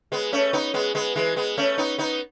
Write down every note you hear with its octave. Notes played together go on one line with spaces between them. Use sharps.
G#3 B3
A3 C#4
B3 D#4
G#3 B3
G#3 B3
E3 G#3
G#3 B3
A3 C#4
B3 D#4
B3 D#4